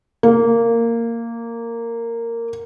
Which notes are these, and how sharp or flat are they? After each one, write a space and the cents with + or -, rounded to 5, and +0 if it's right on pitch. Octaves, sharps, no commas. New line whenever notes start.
A#3 -10